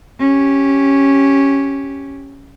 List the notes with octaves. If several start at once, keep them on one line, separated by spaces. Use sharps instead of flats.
C#4 G4